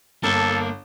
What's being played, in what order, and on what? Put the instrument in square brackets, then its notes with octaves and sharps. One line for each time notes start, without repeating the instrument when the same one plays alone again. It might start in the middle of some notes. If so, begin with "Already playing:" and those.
[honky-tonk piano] G1 A5 [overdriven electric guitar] A#3 [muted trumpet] A4